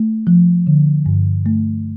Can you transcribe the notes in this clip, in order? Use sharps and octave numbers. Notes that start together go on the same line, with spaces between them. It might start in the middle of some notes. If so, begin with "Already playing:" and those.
Already playing: A3
F3
D3
G2
A3